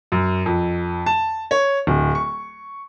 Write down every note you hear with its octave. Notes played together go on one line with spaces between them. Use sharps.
F#2
F2
A5
C#5
D1
C#6